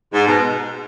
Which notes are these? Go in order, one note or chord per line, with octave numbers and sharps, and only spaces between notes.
G#2
B2